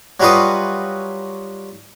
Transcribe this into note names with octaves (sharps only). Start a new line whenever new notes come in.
F#3 G3 F4 F#4 B4 D#5